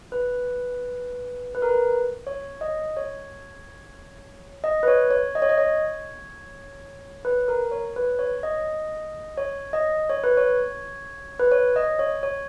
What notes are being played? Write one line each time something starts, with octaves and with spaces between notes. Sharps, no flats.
B4
B4
A#4
B4
C#5
D#5
C#5
D#5
B4
C#5
C#5
D#5
C#5
D#5
C#5
B4
A#4
C#5
B4
C#5
D#5
C#5
D#5
C#5
B4
C#5
B4
C#5
D#5
C#5
C#5